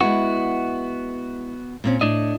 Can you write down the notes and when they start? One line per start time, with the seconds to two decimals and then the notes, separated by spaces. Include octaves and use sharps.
0.01 G#3 B3 E4 F#4
1.84 A#2 C4 C#4
2.01 A2 D4 D5 D#5